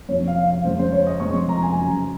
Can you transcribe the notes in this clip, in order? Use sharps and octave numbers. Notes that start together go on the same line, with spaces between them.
F2 C3 F3 C#5
F5
F5
F2 C#3 G#3 C4 C5
C5
C#5
D#5
F2 C3 F3 G#3 C#6
C6
A#5
G#5
F#2 C#3 F#3